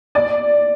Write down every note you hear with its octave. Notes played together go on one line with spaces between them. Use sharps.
D5